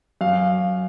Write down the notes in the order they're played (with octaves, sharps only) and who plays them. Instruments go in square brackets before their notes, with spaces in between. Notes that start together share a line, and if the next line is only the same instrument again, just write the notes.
[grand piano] F#2 F5